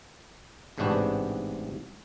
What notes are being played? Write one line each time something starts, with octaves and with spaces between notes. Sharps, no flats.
A1 G#2 C3 D4 F#4 B4